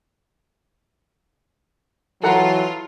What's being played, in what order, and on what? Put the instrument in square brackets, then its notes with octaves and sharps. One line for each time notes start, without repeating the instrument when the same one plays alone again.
[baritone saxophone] E3 [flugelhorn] F#3 [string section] F4 [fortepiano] A4 F#5 A#5